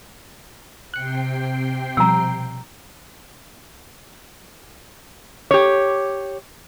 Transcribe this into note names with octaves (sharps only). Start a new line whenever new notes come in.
C3 G5 F#6 C7 C#7
B2 F3 G3 A#5 E6
G4 C#5